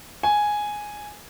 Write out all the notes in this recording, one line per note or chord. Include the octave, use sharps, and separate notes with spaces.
G#5